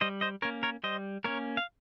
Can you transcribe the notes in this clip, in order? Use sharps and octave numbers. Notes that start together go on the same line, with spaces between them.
G3 C5 D#5
C5 D#5
A#3 C#4 A#4 C#5
A#4 C#5
G3 C5 D#5
A#3 C#4 A#4 C#5
F5